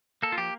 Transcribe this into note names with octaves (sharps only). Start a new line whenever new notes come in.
A#3 A4
F4
F3 G4